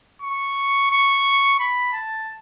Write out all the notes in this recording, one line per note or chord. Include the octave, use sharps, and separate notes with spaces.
C#6
C#6
B5
A5